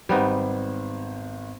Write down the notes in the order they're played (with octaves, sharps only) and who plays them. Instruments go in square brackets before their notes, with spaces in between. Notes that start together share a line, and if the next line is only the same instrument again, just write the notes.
[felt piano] G#1 C5 [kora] G3 B3 D#4